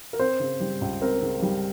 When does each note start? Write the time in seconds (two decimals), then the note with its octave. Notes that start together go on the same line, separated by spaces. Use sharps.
0.13 A#4
0.19 C4 C5
0.40 C#3
0.60 G3
0.81 C#2
1.02 C4 A#4
1.22 C#3
1.42 G3